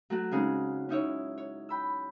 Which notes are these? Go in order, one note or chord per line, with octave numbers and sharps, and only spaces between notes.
F#3 A3 F#4
C#3 G#3 C4 C#4 D#4 G#4
C#4 D#4 E4 C#5
C#5
G5 B5 E6